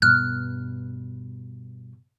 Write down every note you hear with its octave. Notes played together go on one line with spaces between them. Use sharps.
G2 B2 F6 F#6